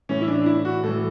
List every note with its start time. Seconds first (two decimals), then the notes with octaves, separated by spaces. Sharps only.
0.09 A2 E3 C#4
0.21 E4
0.28 D4
0.42 D4
0.46 E4
0.65 F#4
0.83 A2 E3 A4